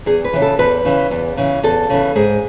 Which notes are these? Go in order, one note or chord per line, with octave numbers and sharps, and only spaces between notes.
E2 G#4
B4
C#3 E3
A4
E2 B4
C#3 E3
E2
C#3 E3
E2 A4
C#3 E3
G#2 G#4